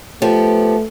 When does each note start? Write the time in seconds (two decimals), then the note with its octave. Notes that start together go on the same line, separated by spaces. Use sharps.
0.22 F3 A3 B3 G4